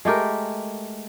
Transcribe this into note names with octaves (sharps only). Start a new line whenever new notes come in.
G#3 A3 G4 A#4